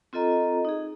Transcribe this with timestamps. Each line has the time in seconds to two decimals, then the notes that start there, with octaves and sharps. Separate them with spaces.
0.13 C4 F4 A4 D#5 A#5
0.65 D#4 G#4